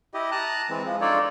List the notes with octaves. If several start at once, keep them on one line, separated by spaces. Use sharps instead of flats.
E4 G4 D#5
A5 A#5 D#6 F#6
E3 G#3 C4
F3 G#3
D4 D#4 F4 A4 C#5 D5